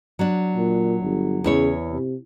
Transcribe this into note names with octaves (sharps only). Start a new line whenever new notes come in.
F#3 D4
A#2
G1
E2 C#3 E4 C#5
C3